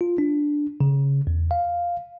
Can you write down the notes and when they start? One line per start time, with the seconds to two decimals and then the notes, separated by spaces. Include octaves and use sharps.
0.01 F4
0.18 D4
0.81 C#3
1.27 E2
1.51 F5